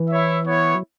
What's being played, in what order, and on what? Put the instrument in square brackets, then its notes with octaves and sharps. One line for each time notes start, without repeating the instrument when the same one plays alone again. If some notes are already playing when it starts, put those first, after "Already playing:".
Already playing: [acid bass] E3
[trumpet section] E4 C#5 E5
B3 E4 C#5
[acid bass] F#3